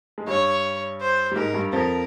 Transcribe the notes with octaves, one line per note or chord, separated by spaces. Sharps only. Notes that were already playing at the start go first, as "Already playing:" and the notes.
G#3
G2 G3 C#5
C5
G3
G#2 G#3 A#4
G2 G3
F2 F3 A#4